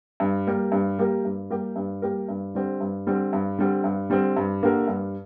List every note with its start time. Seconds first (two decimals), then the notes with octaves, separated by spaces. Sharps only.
0.20 G2
0.47 G3 A#3 G4 A#4
0.72 G2
0.99 G3 A#3 G4 A#4
1.25 G2
1.50 G3 A#3 G4 A#4
1.76 G2
2.02 G3 A#3 G4 A#4
2.29 G2
2.55 D3 G3 C4
2.81 G2
3.07 D3 G3 C4
3.33 G2
3.59 D3 G3 C4
3.84 G2
4.10 D3 G3 C4
4.37 G2
4.63 D3 A#3 G4 A#4
4.88 G2